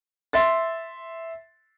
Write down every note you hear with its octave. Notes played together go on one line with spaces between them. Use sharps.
E5 C6 A6